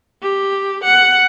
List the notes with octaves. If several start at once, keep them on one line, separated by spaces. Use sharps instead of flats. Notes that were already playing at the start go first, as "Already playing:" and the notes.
G4
F#5